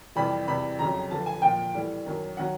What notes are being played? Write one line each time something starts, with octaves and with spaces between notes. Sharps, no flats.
F2 C3 E3 G3 B5
E2 C3 E3 G3 B5
F2 C#3 F#3 A#5
G2 D3 F3 A5
G#5
A#2 F3 G5
A2 E3 G3
F#2 D#3 F#3
D#3 F#3 F#5